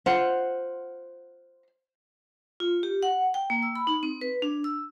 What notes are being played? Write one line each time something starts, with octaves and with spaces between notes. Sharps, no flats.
F4 C5 F#5
F4
G4
F#5
G5
A#3
E6
B5
D#4
C4
B4
D4
E6